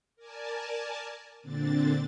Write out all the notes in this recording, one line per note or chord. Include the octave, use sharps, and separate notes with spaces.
A#4 D5 G#5 A5
A#2 D3 C4 D4 A6